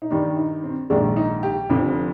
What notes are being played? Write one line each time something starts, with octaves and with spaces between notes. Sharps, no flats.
D#4
G2 D#3 G3 D4
D#4
C4
A#1 G#2 D#3 G#3 D4
D#4
G4
F1 F2 D3 F3